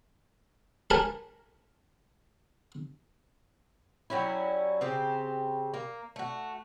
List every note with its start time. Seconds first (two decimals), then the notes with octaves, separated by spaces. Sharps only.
0.90 A#4 G#5 A5 B5
4.10 F#3 G3 C#4 E4
4.81 C#3 C4 G4
5.74 A#3
6.16 A3 F#4